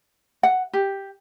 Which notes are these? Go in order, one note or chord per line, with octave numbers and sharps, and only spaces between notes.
F#5
G4